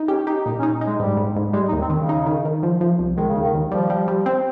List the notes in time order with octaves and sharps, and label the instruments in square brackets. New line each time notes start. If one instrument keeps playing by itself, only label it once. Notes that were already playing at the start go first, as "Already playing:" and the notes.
Already playing: [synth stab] D#4
[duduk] C#4 [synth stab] G4
[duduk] D#4 [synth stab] G4
[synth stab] A#2 [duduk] D#4
[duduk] C#4
[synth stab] D#4
D#4
[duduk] G#3
[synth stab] G#2 [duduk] G3
[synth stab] G#2
G#2
[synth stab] G3 [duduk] G#3
[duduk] D#4
[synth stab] D#2
[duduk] C4
[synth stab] D#3
[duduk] C#3
[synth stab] D#4
D#3
D#3
F3
F3
C2
[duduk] D#3 [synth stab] G#3
[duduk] C#3
[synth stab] D#2
[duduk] D#3
[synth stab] D#2
[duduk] F3 [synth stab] G3
[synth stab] G3
G3
C4